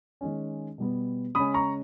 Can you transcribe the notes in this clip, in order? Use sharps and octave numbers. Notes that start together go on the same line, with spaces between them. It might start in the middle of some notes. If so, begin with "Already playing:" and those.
D#3 G#3 C#4
B2 G3 B3
C#3 G#3 C#4 B5 D#6
A#5 C#6